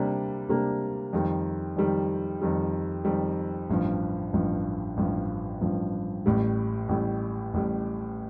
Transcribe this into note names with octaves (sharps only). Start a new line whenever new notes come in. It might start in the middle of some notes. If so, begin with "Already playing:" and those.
Already playing: C3 G3 A#3 D4
C3 G3 A#3 D4
F2 D#3 G3
F2 D#3 G3
F2 D#3 G3
F2 D#3 G3
A1 G2 F3
A1 G2 F3
A1 G2 F3
A1 G2 F3
A1 A2 G3
A1 A2 G3
A1 A2 G3